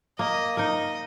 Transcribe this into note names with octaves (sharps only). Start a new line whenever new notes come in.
A#3 D#5
D#4 A#4 D#5